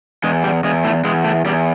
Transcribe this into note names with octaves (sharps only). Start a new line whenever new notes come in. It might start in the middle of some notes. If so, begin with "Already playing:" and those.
E2 G#3
G3
E2 G#3
A2 A3
E2 G#3
A2 A3
E2 G3